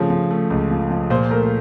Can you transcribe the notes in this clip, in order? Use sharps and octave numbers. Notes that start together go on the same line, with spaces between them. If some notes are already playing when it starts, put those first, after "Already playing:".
Already playing: C#3 F3 A3
F3
A3
C#2
F3
F3
A#2 C5
A3 A#4